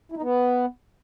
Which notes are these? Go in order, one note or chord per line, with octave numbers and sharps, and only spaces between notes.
E4
D#4
B3